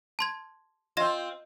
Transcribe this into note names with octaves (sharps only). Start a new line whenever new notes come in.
A5 C6 G#6
C4 F4 D#5 A#6 E7